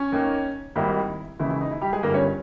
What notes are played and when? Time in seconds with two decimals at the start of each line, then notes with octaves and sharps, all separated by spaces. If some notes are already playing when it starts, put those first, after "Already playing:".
Already playing: C#4 C#5
0.12 D#2 D#3 A#3
0.75 G#1 G#2 D#3 G3 A#3 E4
1.39 D#2 C#3 E3 G#3 E4
1.50 E4
1.61 D#4
1.71 E4
1.81 G3 G4
1.93 G#3 G#4
2.03 G1 G2 G3 A#3 A#4
2.14 C#4 C#5